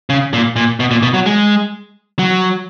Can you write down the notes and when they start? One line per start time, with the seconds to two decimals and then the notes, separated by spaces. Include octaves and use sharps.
0.10 C#3
0.33 A#2
0.56 A#2
0.80 B2
0.91 A#2
1.03 B2
1.14 F#3
1.26 G#3
2.19 F#3